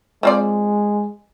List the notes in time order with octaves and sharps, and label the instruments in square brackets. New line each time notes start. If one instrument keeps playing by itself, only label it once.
[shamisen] F3 C4 D5 [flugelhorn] G#3